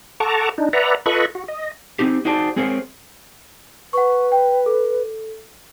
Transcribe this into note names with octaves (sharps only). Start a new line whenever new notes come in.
A4 F#5 A5 A#5 C#6 D6
D4 D#4
B4 D5 E5 F#5 A#5
F4 A4 B4 D#5 B5 C#6
F#4
D#5
C4 D#4 G4
D#4 F#4 G#4 C5 D5 A5
G#3 C4 G#4 A#4 C5 C#5
B4 F#5 C#6
G5
A4